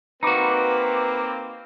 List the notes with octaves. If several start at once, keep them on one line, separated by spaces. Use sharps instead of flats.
A#3 C4 D#4 F#4 B4 A#5 B5 D6